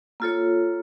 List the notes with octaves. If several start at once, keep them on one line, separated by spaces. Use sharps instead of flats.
A#3 F4 A4 C#5